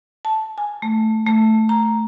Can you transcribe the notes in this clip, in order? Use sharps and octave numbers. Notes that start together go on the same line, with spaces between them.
A5
G#5
A3
A3
A#5